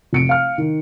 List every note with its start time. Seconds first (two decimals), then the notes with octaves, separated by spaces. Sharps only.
0.13 F1 C#7 D7
0.29 F5 F6
0.58 D#3